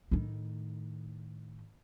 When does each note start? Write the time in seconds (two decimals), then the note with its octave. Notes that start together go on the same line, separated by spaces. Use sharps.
0.11 A2 D#3